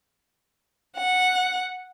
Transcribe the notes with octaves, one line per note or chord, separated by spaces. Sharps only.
F#5